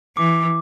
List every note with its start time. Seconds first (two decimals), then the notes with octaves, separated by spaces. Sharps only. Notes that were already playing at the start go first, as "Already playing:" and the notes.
0.17 E3 D6